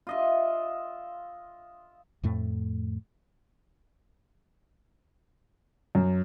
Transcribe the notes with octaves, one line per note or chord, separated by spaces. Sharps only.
F4 D#5 E5
F2 A2 A3
F#2